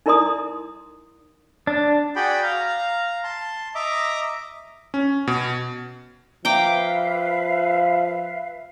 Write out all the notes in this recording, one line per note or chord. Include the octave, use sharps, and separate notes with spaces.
D#4 E4 A#4 D5 C6 D#6
D4
F#4 G#4 D5 G5 B5
F5 A#5
A5 C6
D#5 E5 A#5 D6
C#4
B2
F3 B4 E5 F5 G5 A#5 D6